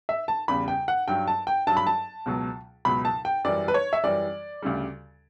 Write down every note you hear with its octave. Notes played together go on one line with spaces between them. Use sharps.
E5
A5
E2 C#3 G3 B5
G5
F#5
G2 F#3 G5
A5
G5
G2 F#3 A5
B5
A5
C#2 B2 F#3
C#2 B2 F#3 B5
A5
G5
F#2 E3 G3 D5
B4
C#5
E5
F#2 E3 G3 D5
D2 C#3 G3